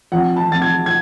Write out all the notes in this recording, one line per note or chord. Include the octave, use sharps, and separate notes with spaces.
F2 F#5
A5
F2 A6
G#6
G#6